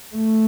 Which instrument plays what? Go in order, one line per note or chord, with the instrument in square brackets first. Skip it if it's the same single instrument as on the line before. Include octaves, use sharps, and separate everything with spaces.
[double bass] A3